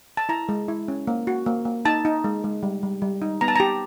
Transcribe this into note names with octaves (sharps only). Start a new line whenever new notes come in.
A5
E4 A#5
G#3
E4
C#4
A#3
F#4
A#3
A#3
D#4 A5
D#4
G#3
G#3
G3
G3
G3
D#4
B3 A#5
A5
G4 A#5